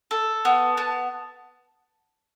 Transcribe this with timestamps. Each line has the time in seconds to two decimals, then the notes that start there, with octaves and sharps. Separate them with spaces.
0.11 A4
0.45 B3
0.77 B3 A5